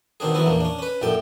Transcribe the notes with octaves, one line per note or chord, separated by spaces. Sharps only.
B2 D#3 C4 D4 G#4
E3 F#3 B3 C#4 E4
A#1 E2 A#3 D4
C#4 D4
C#4 B4
A#1 F#2 A2 D5 G5